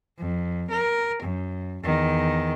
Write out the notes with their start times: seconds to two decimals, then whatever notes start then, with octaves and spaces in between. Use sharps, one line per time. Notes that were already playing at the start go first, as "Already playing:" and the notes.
0.18 F2
0.70 A#4
1.22 F#2
1.83 E2 D#3